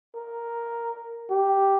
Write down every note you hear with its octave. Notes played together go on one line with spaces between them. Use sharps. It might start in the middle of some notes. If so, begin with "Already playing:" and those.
A#4
G4